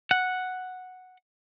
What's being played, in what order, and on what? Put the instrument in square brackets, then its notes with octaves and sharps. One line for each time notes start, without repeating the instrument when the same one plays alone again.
[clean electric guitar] F#5